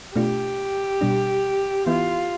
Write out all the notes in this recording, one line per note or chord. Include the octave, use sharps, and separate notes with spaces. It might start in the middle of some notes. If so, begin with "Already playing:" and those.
B2 A3 D4 F4 G4
B2 G3 D4
E3 B3 E4 F4